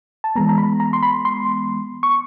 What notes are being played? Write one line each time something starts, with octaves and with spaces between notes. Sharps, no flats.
A5
E3 G#3 B3 A#5
A#5
B5
A#5
C6
B5
C6
C#6